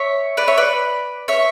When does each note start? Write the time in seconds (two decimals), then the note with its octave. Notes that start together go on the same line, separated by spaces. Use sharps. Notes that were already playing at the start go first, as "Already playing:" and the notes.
Already playing: C#5 E5
0.37 B4 D5
0.48 C#5 E5
0.57 B4 D5
1.28 C#5 E5